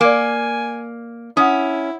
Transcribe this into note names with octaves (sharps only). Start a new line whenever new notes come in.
A#3 D5 G#5 D6
C#4 E4 F#5 D#6